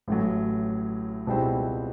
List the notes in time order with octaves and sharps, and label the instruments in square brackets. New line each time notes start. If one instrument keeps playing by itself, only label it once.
[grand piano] A1 A2 F#3
C#2 B2 G3 C4 E4